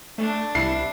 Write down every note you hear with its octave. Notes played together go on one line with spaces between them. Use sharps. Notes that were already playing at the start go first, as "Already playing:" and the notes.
A3 D4
C2 E4 C7